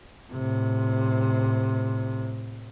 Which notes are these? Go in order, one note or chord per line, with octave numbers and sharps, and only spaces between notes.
A2 C3